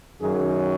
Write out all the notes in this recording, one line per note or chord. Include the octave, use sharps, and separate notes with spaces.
F#2 D#3 F#3 G#4